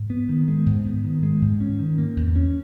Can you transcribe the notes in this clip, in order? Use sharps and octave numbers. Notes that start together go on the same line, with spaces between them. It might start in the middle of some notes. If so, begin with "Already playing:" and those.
Already playing: G#2
B3
D#3
G#3
G#2
B3
D#3
G#3
G#2
C#4
D#3
A#3
E2
C#4